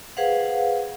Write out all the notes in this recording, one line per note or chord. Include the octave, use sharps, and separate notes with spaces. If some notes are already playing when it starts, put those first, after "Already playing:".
G#4 B4 C5 F5 F#5